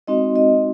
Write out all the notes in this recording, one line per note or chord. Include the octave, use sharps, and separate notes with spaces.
G#3 C4 D#4 F#4 D#5
D#5